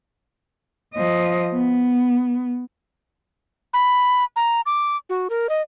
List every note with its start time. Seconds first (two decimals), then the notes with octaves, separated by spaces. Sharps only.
0.94 F3 D#5
1.54 B3
3.73 B5
4.36 A#5
4.66 D6
5.09 F#4
5.30 A#4
5.49 D#5